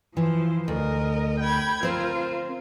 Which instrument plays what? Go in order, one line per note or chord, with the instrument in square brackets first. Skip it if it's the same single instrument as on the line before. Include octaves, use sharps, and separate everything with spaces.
[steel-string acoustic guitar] E3 [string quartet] F3 C5
[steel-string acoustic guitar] D2 [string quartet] A#4 D#5
[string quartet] G5 B5 G#6
[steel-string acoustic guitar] C4 C5 [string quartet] F4 A#4